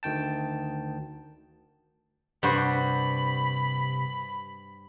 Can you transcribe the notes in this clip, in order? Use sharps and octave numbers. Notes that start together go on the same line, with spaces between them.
D2 D#3 G5 A5
G2 C3 F#4 C5 B5